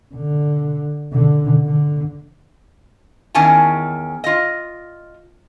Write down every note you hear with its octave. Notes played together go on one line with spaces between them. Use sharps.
D3
D3
D3
E2 D#3 C#4 G#5 A5
F4 D#5